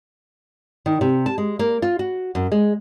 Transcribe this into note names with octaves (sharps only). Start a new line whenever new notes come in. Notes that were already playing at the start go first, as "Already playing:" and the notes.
D#3
C3
A5
G#3
A#3
F4
F#4
F#2
G#3